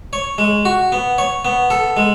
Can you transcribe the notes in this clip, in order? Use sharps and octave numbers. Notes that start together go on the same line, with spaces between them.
C#5
G#3
F#4
B3
C#5
B3
A4
G#3